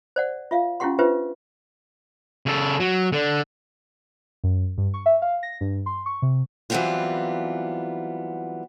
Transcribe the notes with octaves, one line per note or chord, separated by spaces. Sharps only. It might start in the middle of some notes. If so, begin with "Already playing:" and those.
C5 D5 F#5
F4 E5 F5
C#4 E4 F4 G4 F#5 C6
D4 F4 G4 B4 C5 E5
C#3 A4
F#3
D3
F#2
G2
C#6
E5
F5
A#6
G2
C6
C#6
C3
E3 F#3 G3 B3 C4 F4